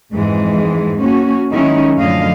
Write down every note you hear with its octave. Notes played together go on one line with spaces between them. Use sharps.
F2 G#2 E3 G#3
A#3 C#4 F#4
D#3 F#3 G#3 C#4 D#4 E4
F#2 A2 D3 F3 D#5 F5